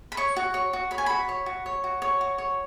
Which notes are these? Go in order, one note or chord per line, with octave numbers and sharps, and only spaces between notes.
B5
C#5 C#6
F#4
C#5
F#4
C#5 B5
G#5
F#4 B5
C#5
F#4
C#5
F#4
C#5
F#4
C#5